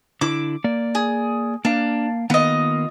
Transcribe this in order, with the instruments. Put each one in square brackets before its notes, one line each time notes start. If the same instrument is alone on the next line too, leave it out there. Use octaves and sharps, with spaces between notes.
[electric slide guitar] D3 E4 [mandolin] D6
[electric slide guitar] A#3 D5
[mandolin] G#4
[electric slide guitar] A#3 F5 [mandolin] D4
[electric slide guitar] D#3 A#3 B3 [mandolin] F4 D#5